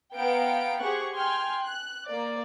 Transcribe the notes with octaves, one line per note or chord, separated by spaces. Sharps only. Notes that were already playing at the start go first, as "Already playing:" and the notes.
B3 F5 G5 A#5 D7
G4 G#4 C5 F#5 C#6 F#6
G5 G#5 C6 F6
F#6
A#3 D5